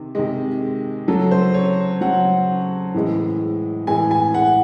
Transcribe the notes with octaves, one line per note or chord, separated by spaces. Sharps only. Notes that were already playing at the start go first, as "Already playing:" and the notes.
Already playing: C3 D#3
C3 D#3 G#3
C#3 F#3 A4
C5
C#5
C#3 F#3 F#5
A2 E3 G#3
A2 E3 G#3 G#5
G#5
F#5